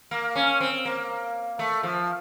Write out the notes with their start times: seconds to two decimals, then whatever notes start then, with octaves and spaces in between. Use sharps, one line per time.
0.11 A#3
0.36 C#4
0.61 C4
0.85 A#3
1.59 A3
1.83 F3